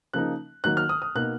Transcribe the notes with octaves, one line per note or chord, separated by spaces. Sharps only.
C#3 F3 A#3 D#4 F#6
D#3 F#3 A#3 D#4 F#6
F6
D#6
D#6
B2 A#3 D#4 F#6